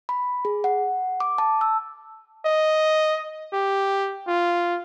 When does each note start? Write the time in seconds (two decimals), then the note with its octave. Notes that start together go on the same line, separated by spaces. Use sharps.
0.09 B5
0.45 G#4
0.64 F#5
1.20 D6
1.38 A5
1.61 E6
2.46 D#5
3.53 G4
4.28 F4